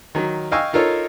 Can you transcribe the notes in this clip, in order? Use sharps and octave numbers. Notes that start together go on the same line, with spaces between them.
D#3 F#3
D#5 F5 G5 G#5 C#6 E6
D#4 F4 A4 A#4 C#5